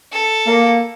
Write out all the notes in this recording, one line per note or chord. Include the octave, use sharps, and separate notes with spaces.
A4
A#3